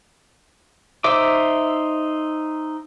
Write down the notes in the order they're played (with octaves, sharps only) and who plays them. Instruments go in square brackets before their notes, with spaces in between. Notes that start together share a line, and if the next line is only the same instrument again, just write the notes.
[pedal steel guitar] D#4 C5 E5 D6